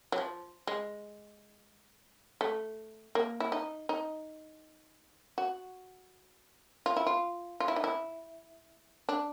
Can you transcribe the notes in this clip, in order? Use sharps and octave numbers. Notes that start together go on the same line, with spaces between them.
F#3
F3
G#3
A3
A#3
E4
D#4
D#4
F#4
F4
E4
F4
F4
E4
D#4
E4
D4